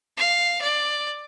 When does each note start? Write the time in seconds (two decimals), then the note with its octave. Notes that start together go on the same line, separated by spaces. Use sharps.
0.17 F5
0.61 D5